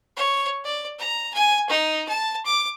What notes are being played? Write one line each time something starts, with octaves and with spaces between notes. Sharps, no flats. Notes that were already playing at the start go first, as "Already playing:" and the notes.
C#5
D5
A#5
G#5
D#4
A5
D6